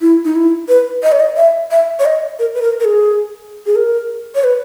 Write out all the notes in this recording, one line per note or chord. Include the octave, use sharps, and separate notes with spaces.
E4
D#4
E4
B4
D#5
C#5
D#5
E5
E5
C#5
D#5
A#4
B4
A#4
A#4
G#4
G#4
A#4
C#5
B4